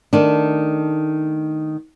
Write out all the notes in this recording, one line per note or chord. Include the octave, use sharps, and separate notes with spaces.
D#3 A3 D4